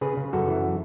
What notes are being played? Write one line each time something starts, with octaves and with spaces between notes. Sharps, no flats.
C#3 G#4 B4
C#3
F#2 F#4 A4
E3